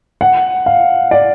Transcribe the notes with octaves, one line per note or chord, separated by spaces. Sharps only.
F#5
F5
D5